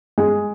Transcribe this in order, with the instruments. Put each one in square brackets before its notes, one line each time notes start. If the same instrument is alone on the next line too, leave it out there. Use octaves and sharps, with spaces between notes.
[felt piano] G#3